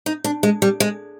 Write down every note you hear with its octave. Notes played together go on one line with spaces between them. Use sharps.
D#4
D4
G#3
G3
G#3